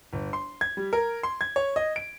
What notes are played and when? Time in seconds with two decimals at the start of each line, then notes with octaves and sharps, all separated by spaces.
0.13 G1
0.33 C6
0.61 G#6
0.77 G3
0.93 A#4
1.23 C6
1.41 G#6
1.56 C#5
1.76 D#5
1.96 D7